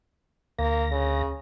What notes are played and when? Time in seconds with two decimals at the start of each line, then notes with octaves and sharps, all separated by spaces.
0.59 D2 A#3 A#6
0.91 C#3